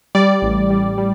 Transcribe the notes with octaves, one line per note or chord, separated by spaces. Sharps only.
G3 D5
A1
G3
G3